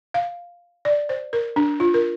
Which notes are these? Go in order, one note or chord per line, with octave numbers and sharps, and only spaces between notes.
F5
D5
C5
A#4
D4
F4
A#4